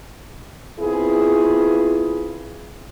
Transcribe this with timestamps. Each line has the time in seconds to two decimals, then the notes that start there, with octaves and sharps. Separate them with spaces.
0.80 B3 C4 E4 F4 G#4